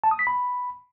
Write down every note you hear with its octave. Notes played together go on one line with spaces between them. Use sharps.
A5
D#6
B6
B5